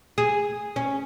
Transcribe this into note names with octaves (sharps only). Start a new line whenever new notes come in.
G#4
C#4